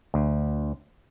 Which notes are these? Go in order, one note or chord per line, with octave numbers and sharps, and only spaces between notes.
D2